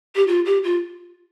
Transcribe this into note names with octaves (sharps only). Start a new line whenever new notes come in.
G4
F4
G4
F4